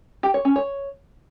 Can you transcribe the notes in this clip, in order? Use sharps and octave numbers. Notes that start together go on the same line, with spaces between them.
G4
C#5
C#4
C#5